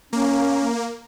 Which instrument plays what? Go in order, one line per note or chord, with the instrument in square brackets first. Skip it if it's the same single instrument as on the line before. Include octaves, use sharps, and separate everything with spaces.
[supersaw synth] A#3 [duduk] C#4